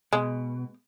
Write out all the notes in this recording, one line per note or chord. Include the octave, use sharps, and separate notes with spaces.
B2 G#3